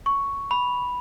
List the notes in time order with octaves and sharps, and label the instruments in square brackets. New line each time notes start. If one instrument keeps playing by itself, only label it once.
[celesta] C#6
[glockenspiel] B5